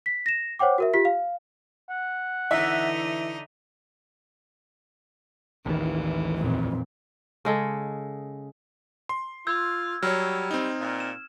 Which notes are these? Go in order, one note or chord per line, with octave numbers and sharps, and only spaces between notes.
B6
A#6 E7
C5 C#5 F#5 G5 D6
F#4 A#4 E5
F4 G4 B6
F5
F#5
D3 E3 D#4 E5
A1 D#2 D#3 E3
F2 A#2
C#3 G#3 A4
C6
F4 E6 G6 G#6
F#3 G3 C#5 F6
C4 D#4
A#2
E7